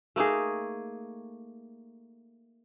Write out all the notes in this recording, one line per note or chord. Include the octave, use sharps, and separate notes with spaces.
A3 A#3 D#4 G#4